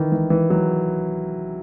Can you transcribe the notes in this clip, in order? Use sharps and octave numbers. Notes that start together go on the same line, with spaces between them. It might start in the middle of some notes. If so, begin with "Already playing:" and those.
Already playing: D#3 E3
E3
E3
F#3